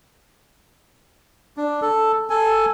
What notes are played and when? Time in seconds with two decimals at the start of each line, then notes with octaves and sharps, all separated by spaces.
1.57 D4
1.82 A4
2.30 A4 G#5